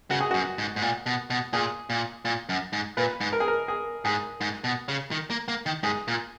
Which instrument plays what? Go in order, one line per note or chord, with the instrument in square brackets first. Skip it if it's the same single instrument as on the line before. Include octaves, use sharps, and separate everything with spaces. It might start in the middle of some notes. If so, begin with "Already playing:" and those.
[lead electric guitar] C#3 [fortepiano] F#4
[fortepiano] G#4
[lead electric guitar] F#2 [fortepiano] F#4
[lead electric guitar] G#2
G#2
A#2
B2
B2
[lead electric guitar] A#2 [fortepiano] G#4
[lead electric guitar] A#2
A#2
F#2
G#2
[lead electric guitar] A#2 [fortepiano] B4
[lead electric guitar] G#2
[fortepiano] A#4
G#4
A#4
G#4
[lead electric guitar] G#2 [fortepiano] G#4
[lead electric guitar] G#2
B2
C#3
D#3
A#3
A#3
D#3
[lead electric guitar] G#2 [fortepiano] G#4
[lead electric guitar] A#2